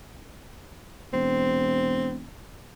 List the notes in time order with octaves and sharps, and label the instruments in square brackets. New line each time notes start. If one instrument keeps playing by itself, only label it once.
[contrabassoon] E1 [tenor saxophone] C4